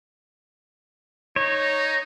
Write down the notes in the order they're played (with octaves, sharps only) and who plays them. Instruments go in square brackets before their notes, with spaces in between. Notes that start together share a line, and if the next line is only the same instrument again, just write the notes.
[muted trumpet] D#4 [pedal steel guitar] C#5